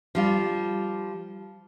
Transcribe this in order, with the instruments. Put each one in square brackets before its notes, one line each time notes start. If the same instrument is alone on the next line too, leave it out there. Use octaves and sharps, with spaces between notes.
[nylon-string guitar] F3 G3 F4